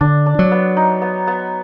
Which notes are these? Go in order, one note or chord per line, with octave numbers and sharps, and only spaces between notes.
D3 D4
D4
F#3
B3
D#4
B3
B3